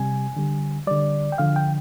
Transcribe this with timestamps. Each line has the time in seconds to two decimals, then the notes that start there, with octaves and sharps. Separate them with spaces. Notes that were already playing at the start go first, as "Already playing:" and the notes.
Already playing: C3 G3 G#5
0.37 D3 G3
0.87 D3 G3 D5
1.32 G5
1.38 D3 F3 F5
1.56 G5